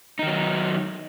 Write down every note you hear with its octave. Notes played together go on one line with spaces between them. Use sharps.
D#3 F#3 D#4